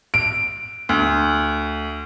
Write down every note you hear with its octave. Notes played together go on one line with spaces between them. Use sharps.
D7
D2